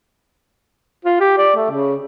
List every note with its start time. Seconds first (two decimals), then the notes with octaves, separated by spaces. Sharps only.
1.05 F4
1.20 G4
1.38 D5
1.56 A3
1.71 C#3